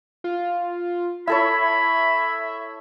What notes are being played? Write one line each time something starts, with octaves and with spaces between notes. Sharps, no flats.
F4
E4 A4 C#5 E5 B5